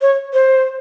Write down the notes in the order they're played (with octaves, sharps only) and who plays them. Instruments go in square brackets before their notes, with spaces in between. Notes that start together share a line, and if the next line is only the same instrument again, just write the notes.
[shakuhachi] C#5
C5